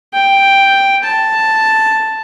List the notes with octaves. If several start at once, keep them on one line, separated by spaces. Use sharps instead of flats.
G5
A5